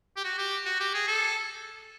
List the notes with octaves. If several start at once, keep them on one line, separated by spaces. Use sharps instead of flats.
G4
F#4
G4
F#4
G4
G#4
A4